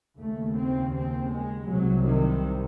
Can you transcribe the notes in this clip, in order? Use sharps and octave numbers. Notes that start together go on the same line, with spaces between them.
D#2 C#3 A3
C4
C4
G#3
C2 C3 F#3
D#3